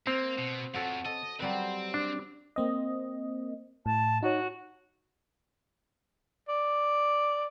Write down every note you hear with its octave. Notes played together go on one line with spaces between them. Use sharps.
A#3 C4
B2
F2 F#4 A4 C#5
A4 D#5
F#3 G3 C4 B4
D4
A#3 C4 D#5
A2 A5
D#4 F#4 C#5
D5